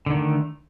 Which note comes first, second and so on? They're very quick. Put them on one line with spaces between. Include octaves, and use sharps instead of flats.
D3 D#3 A3